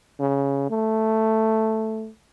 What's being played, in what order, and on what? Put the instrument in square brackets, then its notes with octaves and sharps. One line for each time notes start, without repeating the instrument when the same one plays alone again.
[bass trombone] C#3
A3